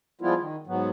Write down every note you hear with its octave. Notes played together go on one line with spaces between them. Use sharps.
F3 G3 G#3 B3 E4 F4
D#3
G#2 F#3 B3